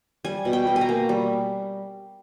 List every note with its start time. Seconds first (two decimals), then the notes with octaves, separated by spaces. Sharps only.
0.25 G3 G#5
0.45 B2
0.53 G5
0.67 B2
0.76 G#5
0.81 A#5
0.89 A#3
1.09 G3